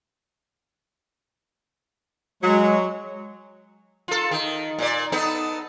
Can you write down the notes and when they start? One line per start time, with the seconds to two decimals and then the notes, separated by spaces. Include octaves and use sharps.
2.43 F#3 G#3
4.08 F4 A4
4.31 D#3
4.79 A#2 D5
5.12 B3 D#4 A4